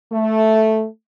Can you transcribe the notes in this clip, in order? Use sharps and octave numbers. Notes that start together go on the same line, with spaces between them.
A3